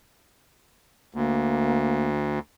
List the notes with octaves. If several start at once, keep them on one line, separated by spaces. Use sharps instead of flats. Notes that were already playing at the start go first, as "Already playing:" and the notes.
D2 A#3